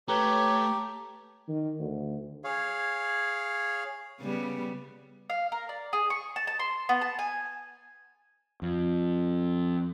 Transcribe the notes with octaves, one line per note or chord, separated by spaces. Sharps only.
A3 G4 B4 C#5 A#5
D#3
D2
G#4 C#5 F5
C#3 G3 B3
F5
A#4
D5
G#4
C#6
A5
A5
C6
B3
A5
G#5
F2